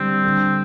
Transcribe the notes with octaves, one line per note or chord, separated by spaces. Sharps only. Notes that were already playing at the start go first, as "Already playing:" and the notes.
Already playing: D3 G3 C4
D3